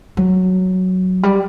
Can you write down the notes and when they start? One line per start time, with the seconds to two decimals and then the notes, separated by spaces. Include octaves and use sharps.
0.17 F#3
1.23 G3